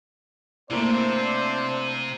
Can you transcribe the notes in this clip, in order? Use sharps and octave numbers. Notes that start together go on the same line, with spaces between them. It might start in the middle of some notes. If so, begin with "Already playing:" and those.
C3 A3 A#3 C4 D4 E4 C5 D5